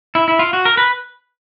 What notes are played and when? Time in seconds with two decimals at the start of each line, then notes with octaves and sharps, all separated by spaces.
0.15 E4
0.28 E4
0.39 F4
0.53 F#4
0.65 A#4
0.77 B4